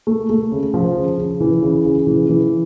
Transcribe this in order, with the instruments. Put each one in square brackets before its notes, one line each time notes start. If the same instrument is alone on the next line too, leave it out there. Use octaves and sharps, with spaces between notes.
[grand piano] A3
A3
C#3
F3
C#3
C#3
E3
C#3
C#3
E3
E3